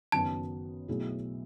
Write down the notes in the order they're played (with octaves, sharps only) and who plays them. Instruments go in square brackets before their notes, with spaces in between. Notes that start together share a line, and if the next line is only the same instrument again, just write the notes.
[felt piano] F#1 F#2 D#3 F#3 B3 [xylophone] A5
[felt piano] B1 B2 A3 E4 G#4